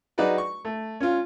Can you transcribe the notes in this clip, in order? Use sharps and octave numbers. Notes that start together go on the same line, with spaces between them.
F#3 D#4 F#4 G#4 B4 D5
C#6
A3
C#4 F4